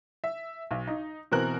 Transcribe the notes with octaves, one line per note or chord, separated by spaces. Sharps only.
E5
B1
D#4
B2 E3 C4 A#4 F#6 F#7